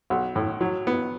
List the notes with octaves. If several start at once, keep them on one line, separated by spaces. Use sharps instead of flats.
B1
A2
F#3
B3